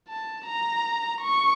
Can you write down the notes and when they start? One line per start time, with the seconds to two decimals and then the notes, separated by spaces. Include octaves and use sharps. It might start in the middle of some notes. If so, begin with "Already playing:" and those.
0.08 A5
0.46 A#5
1.22 C#6